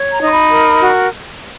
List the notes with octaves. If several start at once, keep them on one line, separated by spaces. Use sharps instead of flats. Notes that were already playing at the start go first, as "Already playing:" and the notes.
Already playing: C#5
A#5
D#4 C6
B5
A#4
F#4